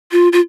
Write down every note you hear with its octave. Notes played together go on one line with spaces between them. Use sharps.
F4
F4